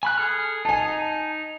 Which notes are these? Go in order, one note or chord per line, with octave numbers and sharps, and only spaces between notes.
G#5 B5 F#6
G#4 A4 F6
D#4 G#5 A5